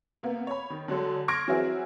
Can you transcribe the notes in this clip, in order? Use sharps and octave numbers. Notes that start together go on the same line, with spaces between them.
C3 A#3 B3
C#5 B5
D#3
D3 F#3 G#3 A4
C6 C#6 F6 G#6 A#6 D7
E3 F#3 C4 E4 F#4 G#4